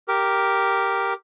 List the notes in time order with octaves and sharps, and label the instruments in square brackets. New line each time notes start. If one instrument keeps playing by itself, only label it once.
[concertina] G4 A#4